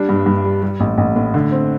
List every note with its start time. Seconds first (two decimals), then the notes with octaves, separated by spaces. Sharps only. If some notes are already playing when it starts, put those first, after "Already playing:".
Already playing: G3 D4
0.09 G2
0.26 G2
0.44 G3
0.62 G3
0.80 A1
0.98 A1
1.16 A2
1.34 D3
1.52 C4